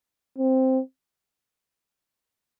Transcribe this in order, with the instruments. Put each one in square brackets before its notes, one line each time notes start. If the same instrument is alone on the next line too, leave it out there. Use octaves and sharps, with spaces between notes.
[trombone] C4